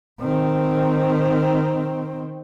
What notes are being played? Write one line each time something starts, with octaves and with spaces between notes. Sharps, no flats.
D#3 C4